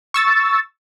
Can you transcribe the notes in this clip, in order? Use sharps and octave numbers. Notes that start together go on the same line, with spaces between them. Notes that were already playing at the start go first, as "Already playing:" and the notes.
C#6 E6 A6